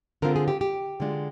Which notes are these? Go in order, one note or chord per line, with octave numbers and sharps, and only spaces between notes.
D3 G#3 C4 F4 A#4
G#4
G4
G4
D3 G#3 D4 F4